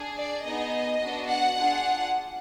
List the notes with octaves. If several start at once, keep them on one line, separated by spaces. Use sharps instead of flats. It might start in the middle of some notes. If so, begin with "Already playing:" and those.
Already playing: D4 G#4
D5
B3 D#4 G#4 D#5
B3 D4 F#4
F#5
D4 F4 G#4